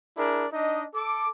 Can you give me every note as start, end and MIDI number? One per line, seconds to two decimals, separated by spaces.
0.18 0.46 62
0.18 0.46 64
0.18 0.46 68
0.18 0.46 70
0.18 0.46 74
0.53 0.85 62
0.53 0.85 63
0.53 0.85 75
0.95 1.29 69
0.95 1.29 86